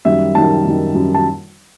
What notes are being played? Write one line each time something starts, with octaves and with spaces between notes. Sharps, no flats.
F#2 D#3 G3 E5
F#2 D#3 G3 A5
F#2 D#3 G3
F#2 D#3 G3
A5